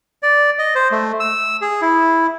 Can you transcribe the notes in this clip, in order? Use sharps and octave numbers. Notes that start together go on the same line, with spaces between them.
D5
D#5
C5
A3
E6
G#4
E4